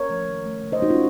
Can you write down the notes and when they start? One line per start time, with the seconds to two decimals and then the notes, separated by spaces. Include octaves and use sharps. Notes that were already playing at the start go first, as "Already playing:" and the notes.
Already playing: A#4 C#5
0.09 F3 A3
0.28 D#3
0.46 A3
0.63 C#3
0.72 C5 D#5
0.82 A3 D#4 F#4
0.90 C#4 F4